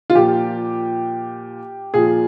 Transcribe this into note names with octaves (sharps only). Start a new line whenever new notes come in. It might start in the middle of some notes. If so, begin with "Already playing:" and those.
F4
A#2 F3 G4
A#2 F3 G#4